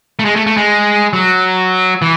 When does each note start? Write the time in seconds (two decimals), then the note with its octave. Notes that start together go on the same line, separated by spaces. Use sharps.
0.19 A3
0.25 G#3
0.36 A3
0.47 A3
0.57 G#3
1.13 F#3
2.02 E3